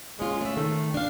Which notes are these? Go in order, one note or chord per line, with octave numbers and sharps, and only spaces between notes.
G#3 C#4 F4
C#3 A3 E5
D#3 A3
D4 F5